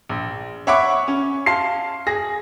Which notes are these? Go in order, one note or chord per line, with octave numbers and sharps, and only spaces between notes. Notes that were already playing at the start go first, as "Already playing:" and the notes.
A#1
C#5 E5 F#5 B5 C#6 D6
C#4
F5 A5 C6 C7
G#4 A#6